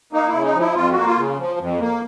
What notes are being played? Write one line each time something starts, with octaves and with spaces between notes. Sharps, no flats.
A#3 D#4
E4
C#3
D#4
F3
E4
F2 F4
F#4
A#3
F4
C#3
F3
F2
A#3